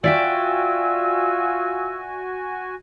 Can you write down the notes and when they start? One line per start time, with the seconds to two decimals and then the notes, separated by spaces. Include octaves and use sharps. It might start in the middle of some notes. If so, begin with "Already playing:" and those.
0.04 F4 F#4 D5 E5 G5 G#5 E6